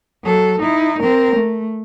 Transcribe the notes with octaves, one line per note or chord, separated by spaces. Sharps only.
F#3 A4
D#4 E4
C4 A#4
A3